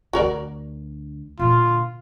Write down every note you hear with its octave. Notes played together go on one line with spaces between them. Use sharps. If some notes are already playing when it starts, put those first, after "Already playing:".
D2 D3 F#4 A#4 D5
A#2 D3 F4